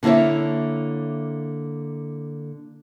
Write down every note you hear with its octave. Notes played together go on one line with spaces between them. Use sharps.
D3 A#3 E4 C#5 E5